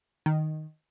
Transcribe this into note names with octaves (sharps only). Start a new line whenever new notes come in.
D#3